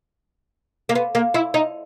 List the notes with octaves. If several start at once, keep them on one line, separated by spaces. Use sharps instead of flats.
A#3
B3
A#3
E4
D#4